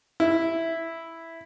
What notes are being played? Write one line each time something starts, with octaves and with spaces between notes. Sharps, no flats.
E4